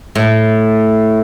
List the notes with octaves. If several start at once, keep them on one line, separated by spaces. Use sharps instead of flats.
A2